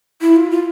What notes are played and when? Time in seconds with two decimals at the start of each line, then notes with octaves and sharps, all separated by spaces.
0.21 E4
0.36 F4
0.51 F4